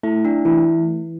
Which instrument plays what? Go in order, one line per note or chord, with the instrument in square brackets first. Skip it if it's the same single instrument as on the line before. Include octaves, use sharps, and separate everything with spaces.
[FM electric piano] A3 [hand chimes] E4
[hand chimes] D4
[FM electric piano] E3 [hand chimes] E4